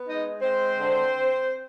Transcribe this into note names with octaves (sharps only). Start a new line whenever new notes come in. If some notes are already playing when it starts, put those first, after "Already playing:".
Already playing: B3
G#3 D#4 D#5
G#3 C4 C5
D3